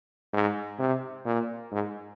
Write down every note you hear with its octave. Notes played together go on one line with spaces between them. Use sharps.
G#2
C3
A#2
G#2